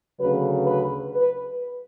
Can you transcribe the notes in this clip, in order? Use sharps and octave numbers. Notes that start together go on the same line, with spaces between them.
D2 C#3 F#3 B4
B4
B4